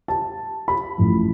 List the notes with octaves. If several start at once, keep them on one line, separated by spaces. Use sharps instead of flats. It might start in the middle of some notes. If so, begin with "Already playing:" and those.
A5
B5
A1 A2 F3